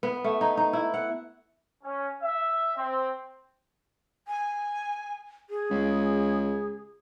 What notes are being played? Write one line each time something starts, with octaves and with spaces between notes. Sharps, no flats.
B3
A3
D#4
D#4
E4
F#5
C#4
E5
C4
G#5
G#4
C#2